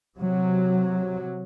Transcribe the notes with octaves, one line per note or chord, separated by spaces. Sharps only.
C3 F#3